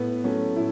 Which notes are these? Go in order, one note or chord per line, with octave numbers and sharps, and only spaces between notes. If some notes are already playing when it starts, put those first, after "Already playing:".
Already playing: A2 B3
F#3 A3 C#4
A2 E4